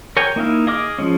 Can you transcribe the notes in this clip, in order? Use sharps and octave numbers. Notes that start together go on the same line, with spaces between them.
A#4 C#5 G5 G#5
A#3 D#4 E4 F5
G#4 D#5 D6 F6
F3 G#3 C#4